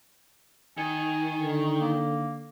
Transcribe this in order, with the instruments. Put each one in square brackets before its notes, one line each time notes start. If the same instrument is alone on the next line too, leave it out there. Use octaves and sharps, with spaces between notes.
[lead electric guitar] D#3 [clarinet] G#5
[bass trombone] D3
[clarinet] A#3